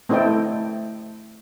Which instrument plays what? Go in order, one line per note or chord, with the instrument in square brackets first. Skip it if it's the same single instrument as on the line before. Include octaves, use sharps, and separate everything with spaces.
[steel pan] A3 C4 E4 A4 D#5 G5